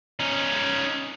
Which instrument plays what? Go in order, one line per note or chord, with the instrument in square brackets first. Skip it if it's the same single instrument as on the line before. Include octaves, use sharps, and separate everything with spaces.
[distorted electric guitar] C#4 D#4